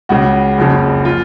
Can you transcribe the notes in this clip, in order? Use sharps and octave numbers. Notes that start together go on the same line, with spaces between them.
C#2 C#3 F#4
F#1 F2 C#3
F4